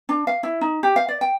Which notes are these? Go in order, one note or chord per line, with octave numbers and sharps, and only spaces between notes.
D4
F5
E4
D#4
G4
F5
D5
G5